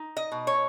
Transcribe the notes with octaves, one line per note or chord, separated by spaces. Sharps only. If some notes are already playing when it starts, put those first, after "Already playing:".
Already playing: D#4
D#5
B2
C#5